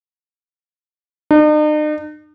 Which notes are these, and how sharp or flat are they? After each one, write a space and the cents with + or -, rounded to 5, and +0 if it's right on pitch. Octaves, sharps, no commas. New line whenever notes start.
D#4 -45